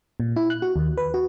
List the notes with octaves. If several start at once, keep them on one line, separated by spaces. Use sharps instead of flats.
A#2
E4
F#6
F#4
D#2
B4
F#4